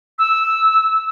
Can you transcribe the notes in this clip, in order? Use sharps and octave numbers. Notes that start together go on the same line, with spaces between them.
E6